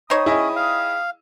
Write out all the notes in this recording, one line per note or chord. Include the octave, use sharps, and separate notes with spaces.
D#4 C5 C#5 G5 B5 D#6
C#4 E4 G#4 D#5
F5